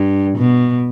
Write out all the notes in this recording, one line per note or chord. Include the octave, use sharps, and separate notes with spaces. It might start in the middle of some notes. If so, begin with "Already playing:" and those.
Already playing: G2
B2